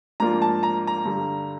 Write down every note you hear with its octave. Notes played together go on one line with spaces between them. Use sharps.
G#2 F3 A#3 D4 F4 A#5
A5
A#5
A#5
G2 D3 G3